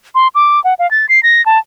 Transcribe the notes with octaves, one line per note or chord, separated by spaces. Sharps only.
C6
D6
F#5
F5
A6
C7
A#6
A5